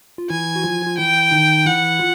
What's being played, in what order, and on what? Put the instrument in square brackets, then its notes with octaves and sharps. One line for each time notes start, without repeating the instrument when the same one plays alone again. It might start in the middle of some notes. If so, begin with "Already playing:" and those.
[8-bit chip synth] F4
[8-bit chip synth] E3 E4 [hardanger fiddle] G#5
[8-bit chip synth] F#4
F3 F4
F4
[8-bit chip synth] E3 E4 [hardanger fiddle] G5
[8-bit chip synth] D#3 D#4
[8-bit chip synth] E3 E4 [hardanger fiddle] F#5
[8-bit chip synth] F4